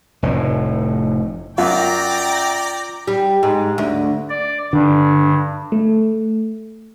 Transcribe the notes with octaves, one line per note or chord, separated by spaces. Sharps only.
F1 A2
F#2 F4 D5 G5 A#5
G3
G#2
D2
D5
G2 D3
A3